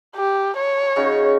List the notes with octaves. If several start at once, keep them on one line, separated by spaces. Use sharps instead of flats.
G4
C#5
C#3 D#4 F#4